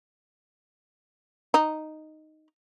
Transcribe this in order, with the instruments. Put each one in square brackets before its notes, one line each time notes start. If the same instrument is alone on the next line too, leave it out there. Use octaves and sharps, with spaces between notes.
[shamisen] D#4